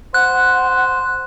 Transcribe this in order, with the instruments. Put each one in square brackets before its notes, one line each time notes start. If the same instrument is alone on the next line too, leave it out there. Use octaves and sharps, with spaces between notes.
[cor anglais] C5 [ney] F#5 [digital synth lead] F#6